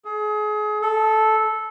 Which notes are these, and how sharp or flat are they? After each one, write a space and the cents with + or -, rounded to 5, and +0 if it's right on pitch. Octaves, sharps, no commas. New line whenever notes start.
G#4 +30
A4 -10